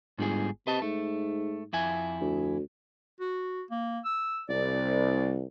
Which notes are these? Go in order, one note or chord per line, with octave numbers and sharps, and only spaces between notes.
G1 G#2 G3 G#4
C3 B4 D#5 A5
G#2 A3
F2 E4 G#5
D2
F#4
A#3
E6
C2 D5